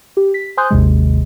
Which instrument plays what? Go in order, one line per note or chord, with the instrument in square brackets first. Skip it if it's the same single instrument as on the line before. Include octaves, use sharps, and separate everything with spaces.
[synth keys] G4
B6
C5 G#5 C6 D#6 F#6 G6
G#1 D#2 C3 G#3